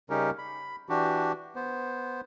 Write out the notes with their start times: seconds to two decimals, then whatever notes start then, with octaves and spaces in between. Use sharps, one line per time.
0.10 C#3 G3 C#4 D#4 G4 A#4
0.38 B5
0.89 E3 D4 F#4 G4
1.56 B3 C5